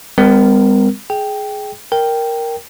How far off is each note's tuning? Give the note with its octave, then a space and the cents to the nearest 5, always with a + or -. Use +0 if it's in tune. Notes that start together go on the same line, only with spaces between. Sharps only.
G3 +45 C4 -45 A#4 +0
G#4 +15 G5 +0
A#4 +0 G5 +0